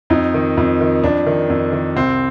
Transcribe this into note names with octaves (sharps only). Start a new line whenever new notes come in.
F2 D#4
D#3
F2
D#3
F2 D4
D#3
F2
D#3
C2 C4